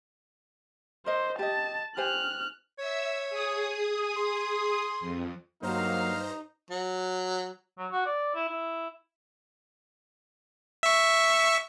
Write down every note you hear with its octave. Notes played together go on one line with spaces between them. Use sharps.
A#4 C5 D#5
G4 D#5 A5
G4 C5 G#5 F6 F#6
C#5 E5 E6
G#4 D#6
C6
F2
G2 F#3 A#3 D#4 C5 F5 A#5
F#3
F#3
F#4
D5
E4
E4
E5 C#6